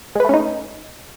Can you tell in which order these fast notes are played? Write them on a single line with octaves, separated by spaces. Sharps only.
G#3 B4 A3 C#4 D#4